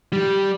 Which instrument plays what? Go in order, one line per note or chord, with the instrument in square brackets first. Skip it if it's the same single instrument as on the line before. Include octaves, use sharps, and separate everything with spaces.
[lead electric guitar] G3